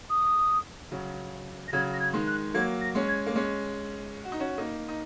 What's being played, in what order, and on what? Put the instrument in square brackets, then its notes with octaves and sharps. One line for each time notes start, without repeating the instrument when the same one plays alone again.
[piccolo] D#6
[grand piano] C#3 F#3
[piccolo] A#6
[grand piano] C#3 F#3 [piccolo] G#6
[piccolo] A#6
G#6
[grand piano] D#3 G#3
[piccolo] F#6
[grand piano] F#3 A#3 [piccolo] G#6
[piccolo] A#6
[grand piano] G#3 C#4
[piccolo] G#6
[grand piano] A#3
G#3 C#4
F#4
D#4
C#4 F#4
A#3 D#4
D#4